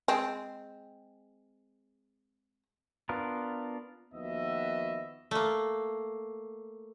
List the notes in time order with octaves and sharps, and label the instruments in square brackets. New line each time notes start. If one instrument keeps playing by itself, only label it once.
[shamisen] G#3 C4
[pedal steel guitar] B3 D4 F4 A#4 B4
[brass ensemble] D#2 F3 B3 F#4 D#5 E5
[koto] A3 A#3